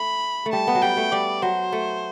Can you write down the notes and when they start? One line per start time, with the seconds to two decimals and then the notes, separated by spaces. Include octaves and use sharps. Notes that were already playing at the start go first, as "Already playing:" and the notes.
Already playing: A3 B5
0.46 A3
0.53 G3 A5
0.67 B3
0.75 F#3
0.82 G3 G5
0.97 A3
1.12 G3 D5
1.42 F#3 C5
1.73 A3